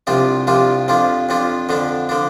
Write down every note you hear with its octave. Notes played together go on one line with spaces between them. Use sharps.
C2 C3 F3 D4 F4
C2 C3 F3 D4 F4
F2 F3 D4 F4
F2 F3 D4 F4
F2 D3 F3 D4
D3 F3 D4